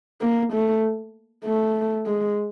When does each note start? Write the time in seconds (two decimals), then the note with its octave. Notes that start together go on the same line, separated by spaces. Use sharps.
0.22 A#3
0.53 A3
1.45 A3
2.06 G#3